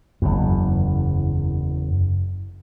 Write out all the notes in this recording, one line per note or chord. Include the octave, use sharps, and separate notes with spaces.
F#1 E2